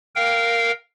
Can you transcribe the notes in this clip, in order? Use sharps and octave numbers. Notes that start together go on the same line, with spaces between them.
A#4 F5 G5